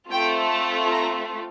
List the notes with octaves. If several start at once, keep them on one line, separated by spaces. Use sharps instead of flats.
A3 C4 F4 A4 G5
A5
A#5